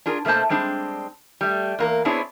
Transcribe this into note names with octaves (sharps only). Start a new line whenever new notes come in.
D4 F4 G#4 A#4
B2 A3 A#3 C5 A5
G3 G#3 C4 D4
G3 A3
E2 A#3 A#4
B3 C4 D4 E4 G#4 C#5